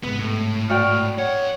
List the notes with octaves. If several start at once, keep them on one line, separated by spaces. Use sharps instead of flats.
G#2 C3 B3
A2
F#4 D5 G5 F6
F2 C#5 F#5